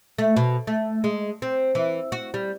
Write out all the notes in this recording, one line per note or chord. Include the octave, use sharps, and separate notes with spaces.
A3
B2
A3
G#3
C4
E3
F#4
G3